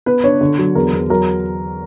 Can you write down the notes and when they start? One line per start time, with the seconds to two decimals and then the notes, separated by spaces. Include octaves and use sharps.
0.06 B3 B4
0.24 D4 C#5
0.41 D3
0.58 F#3
0.75 E2 A#4
0.93 E2
1.10 F#3 A#4